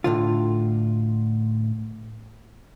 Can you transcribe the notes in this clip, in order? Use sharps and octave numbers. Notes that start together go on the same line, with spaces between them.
A2 D3 F4